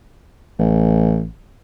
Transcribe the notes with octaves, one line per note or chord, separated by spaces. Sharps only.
A1